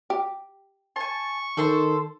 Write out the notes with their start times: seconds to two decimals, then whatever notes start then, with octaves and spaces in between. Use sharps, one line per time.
0.10 G4
0.96 G#5 A5 C#6
1.57 D#3 A4 C5 C6